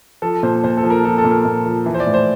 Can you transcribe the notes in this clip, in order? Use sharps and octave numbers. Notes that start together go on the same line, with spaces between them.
F3 A4
A#2 C5
A#2 C5
A4
F3
A#4
F3 A4
A4
A#2
A#4
A#2
F3
E3
C5
D5
A2
C5